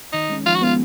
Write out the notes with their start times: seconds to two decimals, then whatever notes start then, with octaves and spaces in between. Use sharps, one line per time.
0.13 D#3 D#4
0.29 G#3 C#4
0.46 F3 F4
0.55 F#4
0.62 G#3 B3 F4